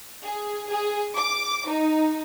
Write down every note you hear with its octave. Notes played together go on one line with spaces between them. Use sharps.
G#4
G#4
D6
D#4